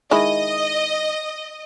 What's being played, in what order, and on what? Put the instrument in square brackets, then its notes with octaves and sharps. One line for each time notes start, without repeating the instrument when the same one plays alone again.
[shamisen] D#3 G#3 E4 [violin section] D#5